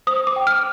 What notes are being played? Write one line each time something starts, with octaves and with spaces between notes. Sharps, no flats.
C5 D#6
D6
G5
F6